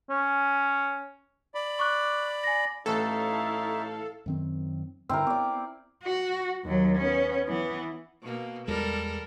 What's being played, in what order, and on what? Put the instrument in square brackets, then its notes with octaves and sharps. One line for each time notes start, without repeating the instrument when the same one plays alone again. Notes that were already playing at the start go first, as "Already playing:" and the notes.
[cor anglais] C#4
[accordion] D5 B5
[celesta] C#6 D6 F#6
G#5 A#6
[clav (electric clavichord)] A1 A2 [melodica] D#4 C#5 E5 [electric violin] E4 F5 [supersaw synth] A4
[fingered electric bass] F#2 D#3 C4
[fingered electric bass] G2 D3 [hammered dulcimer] C4 E4 A#4
[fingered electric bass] B3 [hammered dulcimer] D5 D6
[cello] F#4
D#2 F#3
B3 C#4
E3 B3
[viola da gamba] B2 A#3
[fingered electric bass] E2 G#3 [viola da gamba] G3 A4 A#4